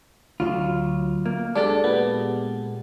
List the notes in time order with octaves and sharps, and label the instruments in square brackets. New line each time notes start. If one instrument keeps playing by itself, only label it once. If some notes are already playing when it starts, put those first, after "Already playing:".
[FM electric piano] D2 F#3 [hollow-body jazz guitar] F4
[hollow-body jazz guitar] A#3
[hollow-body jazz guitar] G#3 G4 A4 [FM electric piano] D4
[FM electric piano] A#2 B3